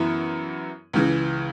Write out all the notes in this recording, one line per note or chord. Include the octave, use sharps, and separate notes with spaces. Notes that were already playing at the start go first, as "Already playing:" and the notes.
Already playing: F#2 E3 B3 E4
C#2 C#3 E3